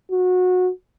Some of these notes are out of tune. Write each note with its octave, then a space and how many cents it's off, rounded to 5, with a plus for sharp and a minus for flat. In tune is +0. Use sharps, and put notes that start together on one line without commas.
F#4 -20